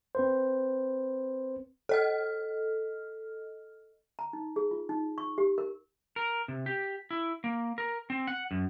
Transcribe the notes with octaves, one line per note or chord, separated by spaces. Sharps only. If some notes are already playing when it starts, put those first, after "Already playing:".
C4 B4 C5
A4 D#5 F6
A#5
D#4
G#4
F4
D#4
C#6
G4
A#4
A#4
C3
G4
E4
A#3
A#4
C4
F#5
F#2